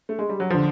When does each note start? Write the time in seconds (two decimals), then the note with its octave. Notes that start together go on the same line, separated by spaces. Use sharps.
0.09 A3
0.19 G#3
0.29 G3
0.40 F#3
0.50 D3 F3